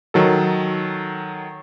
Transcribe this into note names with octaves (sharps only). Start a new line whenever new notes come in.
D#3 F#3 A4